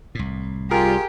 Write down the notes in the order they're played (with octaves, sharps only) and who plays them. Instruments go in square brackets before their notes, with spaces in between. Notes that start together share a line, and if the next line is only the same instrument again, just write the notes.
[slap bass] C2 A2
[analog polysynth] G3 F4 [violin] G4 [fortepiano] G#4 A#4